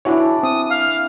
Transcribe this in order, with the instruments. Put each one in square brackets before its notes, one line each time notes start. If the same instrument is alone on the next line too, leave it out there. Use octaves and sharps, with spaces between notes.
[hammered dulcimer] E3 D4 [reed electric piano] E4 F#4 C#5
[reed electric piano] C4 [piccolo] D#6
[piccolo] F5